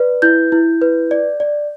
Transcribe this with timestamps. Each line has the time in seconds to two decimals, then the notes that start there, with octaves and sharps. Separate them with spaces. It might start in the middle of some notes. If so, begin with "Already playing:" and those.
Already playing: B4 D5
0.22 E4 G6
0.52 E4
0.82 B4
1.11 D5
1.40 D5